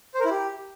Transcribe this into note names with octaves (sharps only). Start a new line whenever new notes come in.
C5
A#4
E4
G4